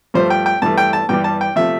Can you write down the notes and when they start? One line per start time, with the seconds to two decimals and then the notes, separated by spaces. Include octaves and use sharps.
0.14 G2 F3 A3 C5
0.30 G5
0.46 G5
0.62 G2 E3 A3 A5
0.78 G5
0.93 A5
1.09 G2 E3 G3 G5
1.24 A5
1.41 G5
1.56 C3 F3 A3 E5